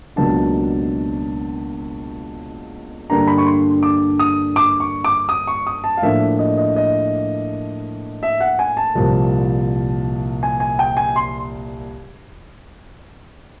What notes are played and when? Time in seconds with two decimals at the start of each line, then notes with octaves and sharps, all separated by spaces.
0.16 C#2 B2 F#3 A#3 D4 A5
3.10 G2 D3 G3 A#3 D4 A#5
3.27 B5
3.38 C#6
3.46 C6
3.83 D6
4.19 D#6
4.56 D6
4.80 C#6
5.04 D6
5.29 D#6
5.47 C#6
5.67 D#6
5.84 A5
5.97 F5
6.02 A2 F3 A#3 D4 E5
6.39 D#5
6.57 D#5
6.76 D#5
8.23 E5
8.40 F#5
8.59 G#5
8.77 A5
8.95 C2 A#2 F3 A#3
10.43 G#5
10.60 G#5
10.79 G5
10.97 G#5
11.16 C6